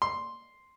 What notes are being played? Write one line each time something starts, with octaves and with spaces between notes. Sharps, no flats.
C6